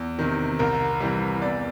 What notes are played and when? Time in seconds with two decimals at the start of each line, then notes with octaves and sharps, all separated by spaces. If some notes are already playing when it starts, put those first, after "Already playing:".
Already playing: E2
0.19 C3 D#3
0.59 C2 A#4
1.00 C3 E3 G3
1.41 E2 D5